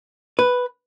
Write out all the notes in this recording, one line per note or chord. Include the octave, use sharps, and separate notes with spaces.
B4